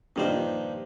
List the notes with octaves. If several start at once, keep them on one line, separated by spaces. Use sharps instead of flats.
G2 A#2 D#3 F3 G3 C5